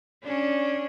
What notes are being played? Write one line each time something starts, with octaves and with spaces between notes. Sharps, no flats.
C#4 D4